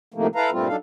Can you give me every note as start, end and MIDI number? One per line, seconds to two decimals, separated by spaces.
0.14 0.27 45
0.14 0.27 48
0.14 0.27 51
0.14 0.27 53
0.14 0.27 57
0.14 0.27 58
0.35 0.50 64
0.35 0.50 69
0.35 0.50 71
0.35 0.50 77
0.35 0.50 82
0.51 0.68 43
0.51 0.68 46
0.51 0.68 55
0.51 0.68 57
0.51 0.68 60
0.51 0.68 65
0.68 0.76 54
0.68 0.76 62
0.68 0.76 63
0.68 0.76 69
0.68 0.76 77